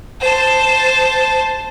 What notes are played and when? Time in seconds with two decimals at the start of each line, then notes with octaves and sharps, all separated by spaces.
0.21 C5 A5